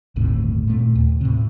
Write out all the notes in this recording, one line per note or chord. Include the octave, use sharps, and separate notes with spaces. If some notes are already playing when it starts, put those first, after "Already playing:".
G1 D#2 A2 C3
A#2 A3
D#2
A2 C3